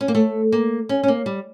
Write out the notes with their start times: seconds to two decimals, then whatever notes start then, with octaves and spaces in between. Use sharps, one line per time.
0.01 C#4
0.08 A#3
0.15 A3
0.52 A#3
0.89 C#4
1.03 C#4
1.08 A#3
1.26 G3